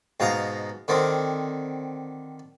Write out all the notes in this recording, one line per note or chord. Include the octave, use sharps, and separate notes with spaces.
G#2 B2 F5 A#5
D3 D#3 C4